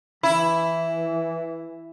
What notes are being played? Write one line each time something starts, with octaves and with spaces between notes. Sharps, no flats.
E3 E4 B5